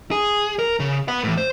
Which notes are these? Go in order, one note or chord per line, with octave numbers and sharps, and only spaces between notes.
G#4
A#4
C#3
B4 F#5
A2 E3
C5